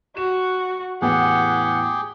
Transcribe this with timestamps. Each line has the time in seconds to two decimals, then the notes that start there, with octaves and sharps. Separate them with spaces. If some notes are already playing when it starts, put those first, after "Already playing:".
0.17 F#4 E7
1.02 E2 A2 B3 G4 G#4 F#5